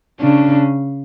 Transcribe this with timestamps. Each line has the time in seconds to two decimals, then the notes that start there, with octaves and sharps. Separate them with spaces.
0.20 C#3 D4